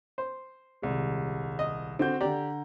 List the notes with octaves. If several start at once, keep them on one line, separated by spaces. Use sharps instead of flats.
C5
D#1 C2 G#3
D#5
D3 C4 F#4 G6
D3 G4 D5 A#5